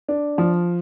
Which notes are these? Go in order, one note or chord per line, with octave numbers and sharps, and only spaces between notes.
D4
F3